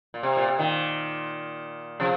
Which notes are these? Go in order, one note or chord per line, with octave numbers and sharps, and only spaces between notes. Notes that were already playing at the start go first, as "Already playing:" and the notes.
A#2
C3
A#2
C3
A#2 D#3
C3 F3